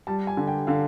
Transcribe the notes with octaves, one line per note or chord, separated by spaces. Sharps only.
G3 A5
G#5
D3
G5
D3 F5